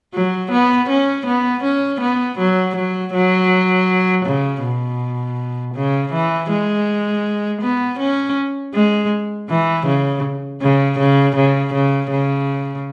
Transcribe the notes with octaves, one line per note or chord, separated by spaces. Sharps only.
F#3
B3
C#4
B3
C#4
B3
F#3
F#3
F#3
C#3
B2
C#3
E3
G#3
B3
C#4
G#3
E3
C#3
C#3
C#3
C#3
C#3
C#3